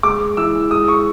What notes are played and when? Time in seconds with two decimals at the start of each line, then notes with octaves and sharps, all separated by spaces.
0.03 G#3 D6
0.37 E3 E6
0.71 G#3 D#6
0.88 C#6